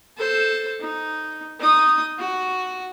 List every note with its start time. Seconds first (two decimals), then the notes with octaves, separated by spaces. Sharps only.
0.18 A4 C5
0.80 D#4
1.60 D#4 D#6
2.18 F#4